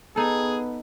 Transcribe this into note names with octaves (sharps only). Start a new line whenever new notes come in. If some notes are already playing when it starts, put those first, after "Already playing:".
B3 D#4 G#4 A4